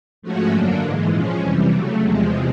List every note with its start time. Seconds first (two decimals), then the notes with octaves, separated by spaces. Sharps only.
0.22 G#2 F3 A3 C#4 F#4
0.51 F#2 D3 F#3 A#3 D4
0.82 G#2 E3 G#3
1.11 A#2 F3 G#3 C#4
1.40 F2 C3 E3 G3
1.71 C#3 F#3 A3
2.01 E2 C3 F3 G#3